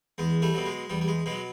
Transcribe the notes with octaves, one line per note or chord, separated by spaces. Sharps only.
E2 G#3
G3 A3
B2 F#3
G#3
E2 G3
G3
G#3
B2 F#3 G#3